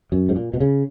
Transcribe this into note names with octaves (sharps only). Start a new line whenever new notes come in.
F#2
G#2
A#2
B2
C#3